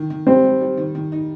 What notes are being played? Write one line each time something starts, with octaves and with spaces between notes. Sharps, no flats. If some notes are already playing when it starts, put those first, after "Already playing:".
Already playing: D#3
D#3
G3 C4
G3
G3
D#3
D#3
D#4